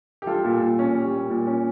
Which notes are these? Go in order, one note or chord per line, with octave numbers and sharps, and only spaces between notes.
G4
G3 F4 A4
A#2
A#2
C#4
G3
A#2
A#2
C#4